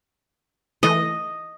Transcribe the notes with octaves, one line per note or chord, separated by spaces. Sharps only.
E3 A3 D#5